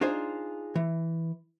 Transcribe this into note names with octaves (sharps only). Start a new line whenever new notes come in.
D4 D#4 F4 G#4 C5
E3